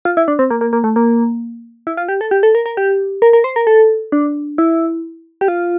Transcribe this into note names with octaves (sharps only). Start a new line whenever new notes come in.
F4
E4
D4
C4
A#3
A#3
A#3
A3
A#3
E4
F4
G4
A4
G4
A4
A#4
A#4
G4
A#4
A#4
C5
A#4
A4
D4
E4
G4
F4